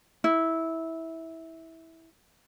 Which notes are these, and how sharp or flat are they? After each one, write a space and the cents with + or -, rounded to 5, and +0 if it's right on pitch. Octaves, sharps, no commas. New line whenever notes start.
E4 -15